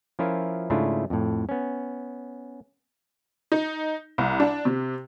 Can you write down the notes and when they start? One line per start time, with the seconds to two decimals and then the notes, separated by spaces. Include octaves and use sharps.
0.19 F3 C#4 E4 F4 A#4 E5
0.70 G#2 C#3 A3 D4 E4 F4
1.10 F2 A2
1.49 B3 C#4
3.52 D#4
4.18 C2
4.40 D4
4.65 C3